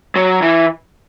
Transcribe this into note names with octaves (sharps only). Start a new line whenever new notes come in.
F#3
E3